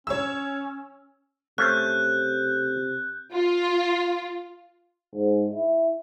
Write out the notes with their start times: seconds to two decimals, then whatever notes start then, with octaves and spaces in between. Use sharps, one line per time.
0.07 C#4 C#5 E6
1.58 C3 A3 C#4 C5 F#6 G6
3.33 F4
5.16 G#2
5.54 E4